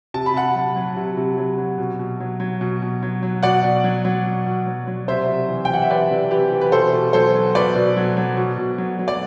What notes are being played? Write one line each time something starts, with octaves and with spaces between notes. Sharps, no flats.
C3 A5
B5
C3 F#5 A5
F#3
F#3
C3
C3
F#3
F#3
B2
B2
F#3
F#3
B2
B2
F#3
F#3
B2 D5 F#5
B2
F#3
F#3
B2
B2
F#3
F#3
C3 C5 E5
C3
E3
G5
E3 F#5
E5
C3 B4 D5
C3
E3 G4 B4
E3
B4
B2 A4 C5
B2
F#3 A4 C5
F#3
B2 B4 D5
B2
F#3
F#3
B2
B2
F#3
F#3
D5